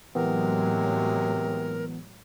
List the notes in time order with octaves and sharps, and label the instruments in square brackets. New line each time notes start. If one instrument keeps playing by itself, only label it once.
[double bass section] A2 F#3 G#3 [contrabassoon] C3 [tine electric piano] E3 B3 [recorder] A#4